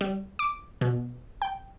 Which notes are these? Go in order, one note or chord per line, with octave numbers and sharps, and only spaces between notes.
G3
D6
B2
G5